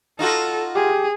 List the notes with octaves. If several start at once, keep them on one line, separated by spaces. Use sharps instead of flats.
D#4 F4 F#4 A4
G4 G#4